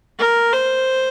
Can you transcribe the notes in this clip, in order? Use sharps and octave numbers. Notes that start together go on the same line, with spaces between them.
A#4
C5